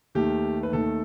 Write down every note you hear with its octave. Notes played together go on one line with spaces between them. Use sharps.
D#2 D#3 A3 G4
B4
D#2 D#3 A3 A4